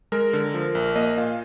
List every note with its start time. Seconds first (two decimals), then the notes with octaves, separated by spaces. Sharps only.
0.12 G#3 A#4
0.33 D3
0.54 F3
0.75 A#1
0.96 A#3 D#5
1.17 A#2 F5